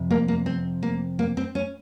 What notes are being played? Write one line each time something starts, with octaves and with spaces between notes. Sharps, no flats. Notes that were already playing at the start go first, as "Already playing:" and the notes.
Already playing: F2 C3
A#3
A#3
C4
A#3
A#3
C4
C#4